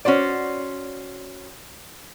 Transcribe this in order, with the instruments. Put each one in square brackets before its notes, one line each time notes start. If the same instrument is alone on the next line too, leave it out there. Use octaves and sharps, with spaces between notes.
[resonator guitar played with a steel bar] C#4 F#4 C5 D5